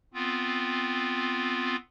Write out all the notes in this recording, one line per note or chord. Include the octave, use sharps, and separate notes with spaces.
B3 C4 F4